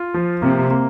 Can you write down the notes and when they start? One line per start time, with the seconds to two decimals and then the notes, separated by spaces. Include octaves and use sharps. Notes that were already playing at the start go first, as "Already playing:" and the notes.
Already playing: F4
0.14 F3
0.42 C3 A#3
0.71 A#3